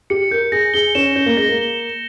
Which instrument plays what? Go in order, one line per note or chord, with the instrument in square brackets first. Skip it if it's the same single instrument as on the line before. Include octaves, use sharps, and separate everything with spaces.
[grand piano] G4 [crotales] C#7
[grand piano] A#4 [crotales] G6
[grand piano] G#4 [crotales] A#6
[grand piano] G#4 [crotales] G7
[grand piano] C#4 [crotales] E7
[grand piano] C#4 [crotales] G6
[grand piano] A#3
[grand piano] G#3 [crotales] A#6
[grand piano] A#3
[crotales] G7
E7